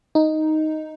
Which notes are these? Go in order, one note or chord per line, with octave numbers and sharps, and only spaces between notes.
D#4